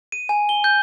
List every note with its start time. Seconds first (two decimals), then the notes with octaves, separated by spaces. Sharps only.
0.12 D#7
0.29 G#5
0.49 G7
0.64 G6